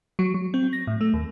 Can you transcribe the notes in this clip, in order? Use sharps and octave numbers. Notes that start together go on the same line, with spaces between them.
F#3
F#3
C4
A#6
A2
A3
D#2